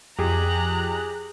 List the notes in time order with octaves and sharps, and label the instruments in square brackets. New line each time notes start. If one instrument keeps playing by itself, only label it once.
[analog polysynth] F2 [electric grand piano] G4 G#4 [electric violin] A#5 F#6